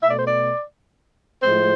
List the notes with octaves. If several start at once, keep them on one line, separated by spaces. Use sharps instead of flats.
B2 A3 E5
D5
C5
D5
A2 F3 G#3 C5